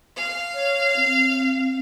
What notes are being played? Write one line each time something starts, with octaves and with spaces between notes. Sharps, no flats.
F5
C#5
C4